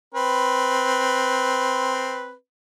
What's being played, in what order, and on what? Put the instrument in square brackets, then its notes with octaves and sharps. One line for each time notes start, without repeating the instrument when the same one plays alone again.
[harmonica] C4 B4